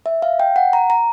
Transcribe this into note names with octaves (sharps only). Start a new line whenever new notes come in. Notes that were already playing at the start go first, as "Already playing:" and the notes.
E5
F5
G5
F#5
A#5
A#5